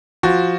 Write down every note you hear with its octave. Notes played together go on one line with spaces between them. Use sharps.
F3 F#4